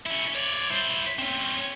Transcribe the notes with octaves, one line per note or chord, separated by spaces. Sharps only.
C#4 E4
C#5 D5
E4 C5
C4 C#4